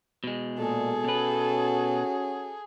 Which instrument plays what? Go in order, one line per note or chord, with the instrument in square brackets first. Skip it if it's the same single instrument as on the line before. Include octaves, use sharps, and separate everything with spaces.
[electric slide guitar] B2 G#3
[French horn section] A#2 [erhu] G#4 [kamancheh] A4
[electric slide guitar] B2 B4 [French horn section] C#4 F#4